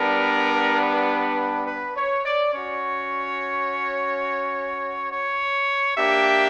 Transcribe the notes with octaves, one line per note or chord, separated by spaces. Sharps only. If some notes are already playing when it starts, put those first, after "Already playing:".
Already playing: G3 B3 D4 A#4
B4
B4
C#5
D5
C#4 F#4 C#5
C#5
A#3 D4 G4 E5